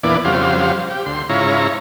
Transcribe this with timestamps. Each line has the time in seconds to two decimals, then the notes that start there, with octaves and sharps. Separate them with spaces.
0.03 E2 A#2 E3 B3 D4 D5
0.25 F2 C#3 F#3 G3 C5 F5
0.90 G4
1.06 D2 C6
1.29 G#2 C#3 E4 F4 C#5 A#5